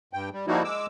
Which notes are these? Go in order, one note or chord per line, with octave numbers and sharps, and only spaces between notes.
G2 G5
G3
F3 G3 A#3 D#4 E4 F#4
G#3 D6 E6